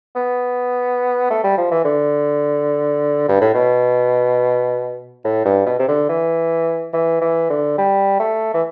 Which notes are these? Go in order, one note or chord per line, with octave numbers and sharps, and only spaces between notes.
B3
A3
G3
F3
E3
D3
G2
A2
B2
A2
G2
B2
C3
D3
E3
E3
E3
D3
G3
A3
E3